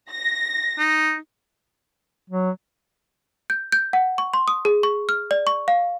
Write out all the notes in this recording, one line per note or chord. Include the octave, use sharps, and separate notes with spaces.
A#6
D#4
F#3
G6
G6
F#5
C#6
C6
D#6
G#4
C#6
F6
D5
C#6
F5